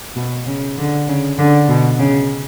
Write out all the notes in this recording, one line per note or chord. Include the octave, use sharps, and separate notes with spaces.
B2
C#3
D3
C#3
D3
B2
C#3